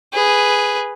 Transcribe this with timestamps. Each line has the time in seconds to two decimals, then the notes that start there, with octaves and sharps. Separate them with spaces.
0.13 G#4 B4